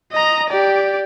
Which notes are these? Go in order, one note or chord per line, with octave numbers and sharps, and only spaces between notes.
D#5 A#5
G4 D5